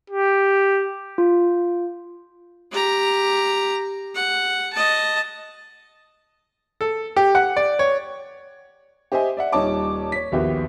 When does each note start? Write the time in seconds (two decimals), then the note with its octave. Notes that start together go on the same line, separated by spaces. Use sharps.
0.10 G4
1.18 F4
2.72 G4 A#5
4.15 F#5
4.73 D#5 A5
6.81 A4
7.16 G4
7.35 F#5
7.56 D5
7.79 C#5
9.12 G4 C5 D#5 E5 G#5
9.37 D5 E5 F#5
9.52 D#1 G3 D#4 C#5 A5 D6
10.12 C#5 B6
10.32 A#1 D#2 B3 F#4 G4 E5